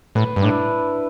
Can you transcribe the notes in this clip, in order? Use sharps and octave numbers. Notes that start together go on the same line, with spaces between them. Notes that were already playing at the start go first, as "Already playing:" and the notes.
A2 B4
G2
A2 D4
E4